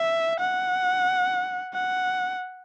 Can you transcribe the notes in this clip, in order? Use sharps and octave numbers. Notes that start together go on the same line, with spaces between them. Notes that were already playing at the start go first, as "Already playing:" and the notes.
Already playing: E5
F#5
F#5